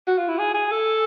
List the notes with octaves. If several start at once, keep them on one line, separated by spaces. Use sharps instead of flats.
F#4
F4
E4
G#4
G#4
A4